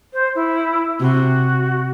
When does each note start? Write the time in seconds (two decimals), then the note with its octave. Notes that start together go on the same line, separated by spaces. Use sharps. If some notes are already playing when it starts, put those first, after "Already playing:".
0.13 C5
0.35 E4
1.00 C3 F#4